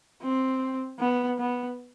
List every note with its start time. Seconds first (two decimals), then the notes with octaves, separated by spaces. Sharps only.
0.22 C4
0.99 B3
1.38 B3